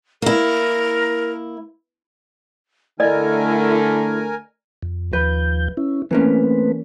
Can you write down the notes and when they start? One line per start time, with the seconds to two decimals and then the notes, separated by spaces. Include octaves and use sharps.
0.22 A#3 E4 A#4
3.00 D3 A3 E4 A#4 D5 D#5 G#5
4.83 F2
5.13 D#2 F3 B4 G6
5.77 C#4 E4
6.11 E3 A3 A#3 C4 C#4 B4